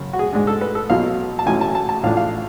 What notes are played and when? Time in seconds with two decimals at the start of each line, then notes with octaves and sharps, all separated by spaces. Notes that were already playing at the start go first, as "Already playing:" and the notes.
Already playing: F#2 C#3
0.13 F#4
0.19 G#4
0.33 G#2 G#3 D4 G#4
0.47 A4
0.61 B4
0.75 A4
0.90 B1 B2 F#3 F5
1.39 A5
1.46 A1 A2 F#3 C#4 G#5
1.61 A5
1.75 A5
1.89 A5
2.03 A1 A2 F3 A3 D4 F5
2.17 F5